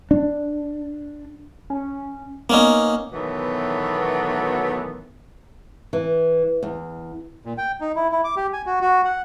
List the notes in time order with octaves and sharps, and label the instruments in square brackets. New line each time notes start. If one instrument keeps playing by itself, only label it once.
[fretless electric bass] D4
[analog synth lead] C#4
[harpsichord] A#3 C#4 D#4 [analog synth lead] B3
[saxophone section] B2 D#3 E3 F#3 A3 B3
[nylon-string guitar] E3
E2
[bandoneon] A#2
G5
D#4
E4
E4
D6
G4
G#5
F#4
F#4
F#5